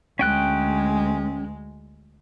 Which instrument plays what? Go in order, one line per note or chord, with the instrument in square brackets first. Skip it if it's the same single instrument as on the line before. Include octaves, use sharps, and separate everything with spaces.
[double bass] D2 G#3 [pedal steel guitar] C#4 G5 F#6